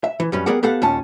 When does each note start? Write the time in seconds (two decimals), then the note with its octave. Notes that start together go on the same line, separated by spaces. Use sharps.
0.04 E5
0.20 E3
0.32 F#2 G3 C#4 B4
0.46 G3 B3 G#4 A#4 D5 F#5
0.63 B3 G4 A4 F5 F#5
0.82 D#2 A#2 C#4 A5